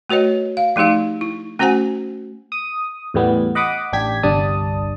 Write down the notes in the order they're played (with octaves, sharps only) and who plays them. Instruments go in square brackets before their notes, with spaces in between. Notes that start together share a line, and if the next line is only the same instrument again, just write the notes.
[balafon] A3 F#4 B4 C#5 D#5
F5
F3 A3 D#4 G4 F5
E4
A3 C#4 F#4 C5 F#5 G#5
[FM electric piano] D#6
E2 A2 G3 B3
D#5 F#5 B5 D6 D#6
A1 D4 G4 G#6 B6
G1 C2 G3 D4 A5 D#6